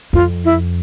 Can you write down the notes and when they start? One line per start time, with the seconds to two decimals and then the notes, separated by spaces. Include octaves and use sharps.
0.13 F2 F4
0.45 E4